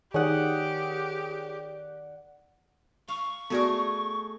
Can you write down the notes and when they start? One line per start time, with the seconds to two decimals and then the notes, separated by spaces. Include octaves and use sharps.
0.14 D#3 G4 G#4 C#5 D5 F#5 D#6
3.08 F5 C#6
3.50 A3 B3 F#4 G#4 A#4 D5